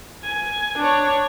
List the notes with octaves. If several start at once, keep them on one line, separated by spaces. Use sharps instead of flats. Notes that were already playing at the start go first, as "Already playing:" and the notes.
G#5
D4 C#5